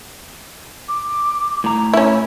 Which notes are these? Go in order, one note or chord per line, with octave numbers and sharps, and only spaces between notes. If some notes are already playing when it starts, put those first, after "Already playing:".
D6
A2 A#5
C#4 E4 B5